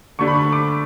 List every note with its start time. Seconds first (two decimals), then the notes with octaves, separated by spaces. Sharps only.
0.19 D3 A3 D4 C#6
0.28 B5
0.35 C#6
0.52 D6